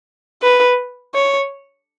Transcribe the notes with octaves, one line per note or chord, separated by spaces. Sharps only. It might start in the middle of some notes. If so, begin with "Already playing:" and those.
B4
C#5